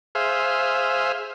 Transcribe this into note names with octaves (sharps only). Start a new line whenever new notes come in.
G#4 C5 E5 F5